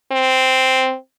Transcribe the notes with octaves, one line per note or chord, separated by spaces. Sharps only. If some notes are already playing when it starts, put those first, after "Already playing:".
C4